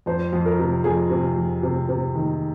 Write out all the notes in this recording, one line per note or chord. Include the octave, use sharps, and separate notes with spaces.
F2 C5
F2
A#4
C3
F2 G#4
C3
F2
C3
C3
D#3